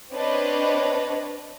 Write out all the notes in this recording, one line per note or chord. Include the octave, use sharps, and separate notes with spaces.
C4 D4 B4 C#5 D#5